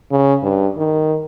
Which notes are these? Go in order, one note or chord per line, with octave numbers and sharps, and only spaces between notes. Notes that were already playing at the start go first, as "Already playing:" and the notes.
C#3
G2
D#3